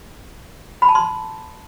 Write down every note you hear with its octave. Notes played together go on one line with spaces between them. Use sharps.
B5
A5
C6